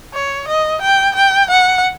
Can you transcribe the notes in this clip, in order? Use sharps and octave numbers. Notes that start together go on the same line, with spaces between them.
C#5
D#5
G5
G5
F#5